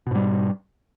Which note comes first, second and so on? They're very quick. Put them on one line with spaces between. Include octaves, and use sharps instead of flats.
B2 G#2 G3